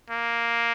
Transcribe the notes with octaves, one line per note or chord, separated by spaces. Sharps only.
A#3